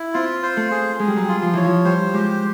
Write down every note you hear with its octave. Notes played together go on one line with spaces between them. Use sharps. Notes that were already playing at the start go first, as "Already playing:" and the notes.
Already playing: E4
C4 F4
C5
A3
G#4
G#3 G#4
G3
F#3
G3 F4
F3
E3 C#5
F3
G3 C5
G#3 G4